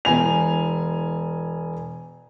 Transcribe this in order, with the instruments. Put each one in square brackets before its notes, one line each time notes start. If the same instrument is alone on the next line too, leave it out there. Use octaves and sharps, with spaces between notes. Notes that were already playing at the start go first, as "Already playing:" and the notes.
[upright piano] E1 G#5 F7